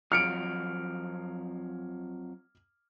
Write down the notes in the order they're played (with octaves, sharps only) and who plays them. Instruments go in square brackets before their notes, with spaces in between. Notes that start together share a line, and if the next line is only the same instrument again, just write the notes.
[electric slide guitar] F2 F3 F#3 [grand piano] F6 C#7 D7